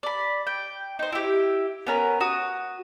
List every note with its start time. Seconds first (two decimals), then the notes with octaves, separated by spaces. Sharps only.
0.03 D5 B5
0.47 G5
0.99 D#4 C5
1.12 E4 G4
1.87 B3 C#4 A#4
2.20 F#4 D#6